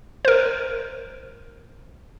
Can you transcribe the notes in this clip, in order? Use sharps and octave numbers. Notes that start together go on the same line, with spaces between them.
A#4 C5